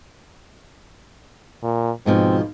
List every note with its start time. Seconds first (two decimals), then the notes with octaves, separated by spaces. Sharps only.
1.63 A#2
2.06 G#2 B2 F3 C4